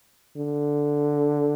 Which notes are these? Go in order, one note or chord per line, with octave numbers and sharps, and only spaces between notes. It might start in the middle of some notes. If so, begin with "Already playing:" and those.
D3